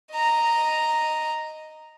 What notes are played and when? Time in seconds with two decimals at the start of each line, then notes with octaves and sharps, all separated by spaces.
0.12 D#5 A#5